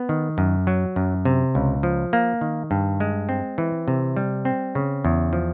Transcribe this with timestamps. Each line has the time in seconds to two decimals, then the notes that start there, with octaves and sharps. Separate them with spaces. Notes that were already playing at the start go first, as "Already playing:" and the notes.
Already playing: B3
0.09 D#3
0.38 F#2
0.67 F#3
0.96 F#2
1.25 C3
1.55 C#2
1.83 F3
2.13 A#3
2.41 D#3
2.71 G2
3.00 G#3
3.29 C4
3.58 E3
3.88 C3
4.17 G3
4.45 C4
4.75 C#3
5.05 E2
5.33 F3